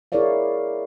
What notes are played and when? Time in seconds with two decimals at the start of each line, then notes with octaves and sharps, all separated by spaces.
0.12 E4 G#4 A#4 C#5 D5 F5